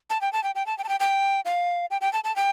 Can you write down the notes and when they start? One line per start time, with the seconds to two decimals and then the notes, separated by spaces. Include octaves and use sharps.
0.10 A5
0.21 G5
0.33 A5
0.44 G5
0.55 G5
0.66 A5
0.78 G5
0.84 A5
0.89 G5
1.00 G5
1.45 F5
1.91 G5
2.01 G5
2.13 A5
2.24 A5
2.36 G5